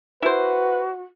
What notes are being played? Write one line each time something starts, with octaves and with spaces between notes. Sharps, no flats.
E4 F#4 B4 C5